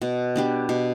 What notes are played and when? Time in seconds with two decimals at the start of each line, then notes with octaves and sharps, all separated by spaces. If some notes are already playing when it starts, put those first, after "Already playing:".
0.02 B2
0.36 B3 D4 G4
0.69 B2